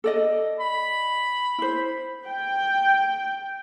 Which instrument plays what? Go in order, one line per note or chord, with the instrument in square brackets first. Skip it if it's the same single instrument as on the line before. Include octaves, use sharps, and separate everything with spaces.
[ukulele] A4 D5 D#5
[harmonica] B5
[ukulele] E4 C5
[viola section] G5